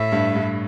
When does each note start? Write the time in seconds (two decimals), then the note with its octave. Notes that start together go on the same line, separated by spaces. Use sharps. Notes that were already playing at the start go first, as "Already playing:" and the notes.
Already playing: A2 E5
0.12 G2
0.35 G2